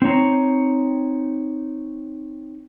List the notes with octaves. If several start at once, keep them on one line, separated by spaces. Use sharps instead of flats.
C4 D#4 C#5 A#5